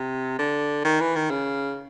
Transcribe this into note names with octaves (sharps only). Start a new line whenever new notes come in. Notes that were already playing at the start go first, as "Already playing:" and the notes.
Already playing: C3
D3
D#3
E3
D#3
C#3